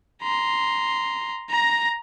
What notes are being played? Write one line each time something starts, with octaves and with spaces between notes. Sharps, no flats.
A#5 C6
A#5 A#6